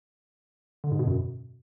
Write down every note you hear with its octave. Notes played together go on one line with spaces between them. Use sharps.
D3
G#2
B2
F#2